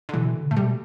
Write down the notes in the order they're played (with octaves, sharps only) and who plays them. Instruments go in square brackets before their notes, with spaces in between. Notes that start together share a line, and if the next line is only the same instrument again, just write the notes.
[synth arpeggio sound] D3
[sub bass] B2 [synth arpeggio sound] E3
[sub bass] D3
[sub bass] A2 [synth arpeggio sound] A3
[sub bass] B2 [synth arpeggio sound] G3